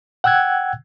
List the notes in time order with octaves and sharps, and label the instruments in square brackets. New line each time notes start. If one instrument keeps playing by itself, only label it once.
[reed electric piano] F#5 G5 E6 F#6 G#6